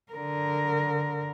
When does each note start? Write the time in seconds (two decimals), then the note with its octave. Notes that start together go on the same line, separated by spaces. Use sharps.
0.12 D3 A#4